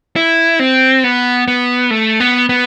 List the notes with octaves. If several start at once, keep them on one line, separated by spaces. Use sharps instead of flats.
E4
C4
B3
B3
A3
B3
B3